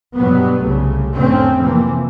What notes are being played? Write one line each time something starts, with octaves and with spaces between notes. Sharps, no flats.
G2 B2 F#3 G3 B3
C2 C#3 A3
F2 A2 D3 A3 C4 C#4
C3 E3 F3 A#3 C4